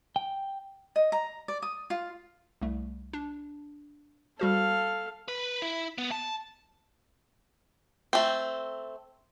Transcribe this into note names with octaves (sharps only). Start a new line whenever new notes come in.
G5
D#5
A#5
D5
D#6
F4
C2 A3
D4
G3 F#4 A4 C5 F5
B4
E4
B3
A5
A3 C4